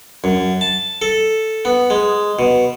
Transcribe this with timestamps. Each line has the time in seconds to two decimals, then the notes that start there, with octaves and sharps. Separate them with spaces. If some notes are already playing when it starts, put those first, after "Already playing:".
0.24 F#2
0.61 A5
1.02 A4
1.65 B3
1.90 G#3
2.39 B2